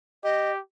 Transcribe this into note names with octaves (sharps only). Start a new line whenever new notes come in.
G4 D#5